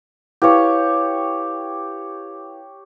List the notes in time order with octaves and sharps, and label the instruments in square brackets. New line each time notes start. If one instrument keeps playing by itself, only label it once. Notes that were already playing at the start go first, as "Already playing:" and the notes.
[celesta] E4 B4 F5 [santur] G4 C#5